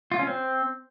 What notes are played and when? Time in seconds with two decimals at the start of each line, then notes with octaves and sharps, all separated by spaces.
0.12 F4
0.19 C#4
0.27 C4